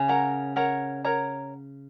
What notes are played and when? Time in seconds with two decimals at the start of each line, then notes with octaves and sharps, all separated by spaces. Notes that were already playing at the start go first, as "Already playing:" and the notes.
Already playing: C#3
0.08 A#4 C#5 F#5 A#5
0.56 A#4 C#5 F#5 A#5
1.05 A#4 C#5 F#5 A#5